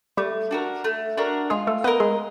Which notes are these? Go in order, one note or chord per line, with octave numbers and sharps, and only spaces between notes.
G3 A3 G4
D4 F#4 A#4
A3
D4 F#4 A#4
G#3 F4 G#4
A3 A4
B3 A#4 B4 D#5
G#3 G#4